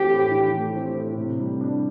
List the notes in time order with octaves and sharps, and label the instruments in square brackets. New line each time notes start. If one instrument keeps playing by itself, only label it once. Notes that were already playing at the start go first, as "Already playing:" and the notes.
Already playing: [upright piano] E3 A3 C4 [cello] G4
[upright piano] A2
E3
A3
C4
A2
C3
G3
D4